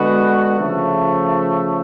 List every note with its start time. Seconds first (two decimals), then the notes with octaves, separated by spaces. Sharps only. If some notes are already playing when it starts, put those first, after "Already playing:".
Already playing: D3 G#3 B3 F#4 B4
0.59 C#3 F3 A3